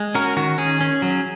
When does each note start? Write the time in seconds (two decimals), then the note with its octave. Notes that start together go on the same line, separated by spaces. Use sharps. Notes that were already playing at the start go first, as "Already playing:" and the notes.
Already playing: G#3
0.15 C#4 F#4 A#4
0.37 D#3 F#4
0.58 C#4 G#4
0.81 C#4
1.02 F#3